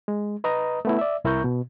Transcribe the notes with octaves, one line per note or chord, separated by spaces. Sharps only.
G#3
B4 D#5 A#5 D#6
A3 B3 E4
D5 E5
C2 E4 A#4 A#5 C#6 G6
B2